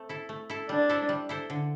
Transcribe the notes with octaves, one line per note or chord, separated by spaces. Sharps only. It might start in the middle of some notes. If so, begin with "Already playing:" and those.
Already playing: A3 C4
E4 A4
A3
E4 A4
G3 D4
E4 A4 C5
G3
E4 A4 C5
D3